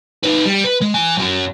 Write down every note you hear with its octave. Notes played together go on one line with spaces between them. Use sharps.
D#4 B4
G3
B4
G#3
E3 G#5
F#2 F#3